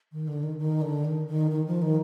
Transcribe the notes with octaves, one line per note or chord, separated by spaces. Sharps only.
D#3
D3
D#3
D#3
D3
D#3
D#3
D#3
F3
D#3